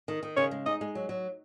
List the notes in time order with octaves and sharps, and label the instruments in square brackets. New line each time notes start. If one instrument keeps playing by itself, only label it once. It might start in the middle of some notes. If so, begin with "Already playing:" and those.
[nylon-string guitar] D#3
D#3
[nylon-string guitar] C#3 [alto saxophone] C#5
[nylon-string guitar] G#3
[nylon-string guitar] D#4 [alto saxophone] D#5
[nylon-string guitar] G#3
F#3
F#3